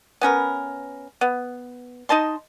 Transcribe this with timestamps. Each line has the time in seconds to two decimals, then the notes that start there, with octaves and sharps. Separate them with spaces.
0.21 B3 C#4 A#4 B4
1.21 B3
2.09 D#4 D#5 A5 C6